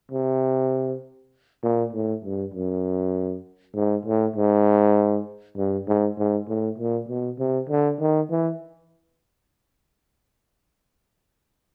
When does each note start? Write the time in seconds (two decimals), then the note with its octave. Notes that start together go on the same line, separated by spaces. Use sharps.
0.12 C3
1.63 A#2
1.93 A2
2.24 G2
2.54 F#2
3.75 G#2
4.06 A2
4.36 G#2
5.57 G2
5.88 G#2
6.18 G#2
6.48 A2
6.78 A#2
7.09 B2
7.39 C3
7.69 D3
8.00 D#3
8.30 E3